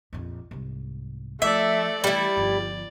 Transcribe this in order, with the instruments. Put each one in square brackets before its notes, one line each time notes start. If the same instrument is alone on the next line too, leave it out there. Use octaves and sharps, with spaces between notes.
[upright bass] A#1 F2
C2 G#2
[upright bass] F3 [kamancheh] A3 D5 [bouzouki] E5
[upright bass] E3 A3 [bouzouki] G3 E4 [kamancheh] D5
[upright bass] G1 F3